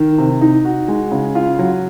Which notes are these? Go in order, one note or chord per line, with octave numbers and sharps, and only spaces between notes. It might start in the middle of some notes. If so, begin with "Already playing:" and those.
Already playing: D#3
C3
D#4
F#4
G#3
C#3
F4
F#3